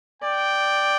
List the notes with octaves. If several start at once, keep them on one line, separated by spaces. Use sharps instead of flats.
D5 G5